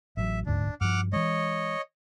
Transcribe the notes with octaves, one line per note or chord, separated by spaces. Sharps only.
A1 F#3 E5
D#1 D2 G#2 D4
G2 F3 F#5 D6 F6
E3 G#3 C#5 D#5